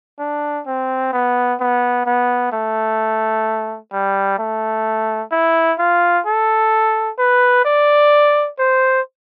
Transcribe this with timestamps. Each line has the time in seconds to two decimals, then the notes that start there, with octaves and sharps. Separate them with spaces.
0.19 D4
0.66 C4
1.13 B3
1.60 B3
2.06 B3
2.52 A3
3.92 G3
4.39 A3
5.32 E4
5.79 F4
6.26 A4
7.18 B4
7.65 D5
8.59 C5